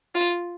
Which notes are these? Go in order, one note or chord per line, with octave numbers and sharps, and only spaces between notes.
F4